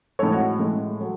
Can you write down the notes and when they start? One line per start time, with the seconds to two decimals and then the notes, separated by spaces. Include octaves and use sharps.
0.19 A2 G#3 A4 C#5
0.33 F#4
0.59 A2 G#3
0.99 F#3 A3